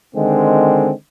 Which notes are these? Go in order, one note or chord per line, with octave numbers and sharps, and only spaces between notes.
D3 D#3 G#3 C4